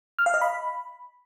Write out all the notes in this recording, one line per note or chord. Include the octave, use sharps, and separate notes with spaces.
F6
F5
D#5
B5